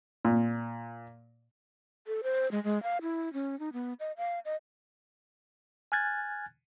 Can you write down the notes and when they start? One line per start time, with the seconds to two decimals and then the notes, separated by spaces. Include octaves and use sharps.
0.25 A#2
2.07 A4
2.23 C5
2.51 G#3
2.64 G#3
2.83 F5
3.02 E4
3.33 C#4
3.60 D#4
3.73 B3
4.00 D#5
4.17 F5
4.45 D#5
5.92 G#5 F6 F#6 G#6 A6